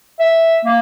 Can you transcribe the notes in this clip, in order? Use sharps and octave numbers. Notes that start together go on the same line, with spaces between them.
E5
A#3